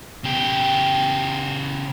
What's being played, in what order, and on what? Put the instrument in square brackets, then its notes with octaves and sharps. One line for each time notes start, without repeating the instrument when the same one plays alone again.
[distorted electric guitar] C#3 G4